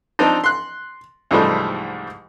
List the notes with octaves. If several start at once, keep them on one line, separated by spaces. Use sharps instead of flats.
F3 C4 D4 D#4
C6 F#6
C2 G#2 E3 F3 G3 A3